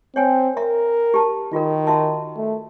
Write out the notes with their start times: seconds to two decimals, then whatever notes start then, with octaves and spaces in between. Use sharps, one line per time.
0.16 C4 C#5 G5 G#5
0.57 A#4 E5 A#5
1.14 G4 A5
1.53 D#3 F4 F#4 A#4
1.87 F#4 E5 A5
2.37 A3